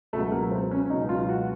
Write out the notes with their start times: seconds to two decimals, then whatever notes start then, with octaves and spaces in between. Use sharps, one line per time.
0.13 C#2 B2 F#3 A3
0.32 A#3
0.51 C4
0.71 C#4
0.90 C#2 B2 F#3 D#4
1.09 F4
1.29 F#4